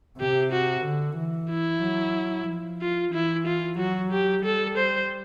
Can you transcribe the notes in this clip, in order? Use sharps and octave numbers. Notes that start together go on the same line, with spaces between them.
C3 G4
F#4
D3
E3
E4
F#3
F3
F4
E3 E4
F4
F#3 F#4
G4
G3 A4
C5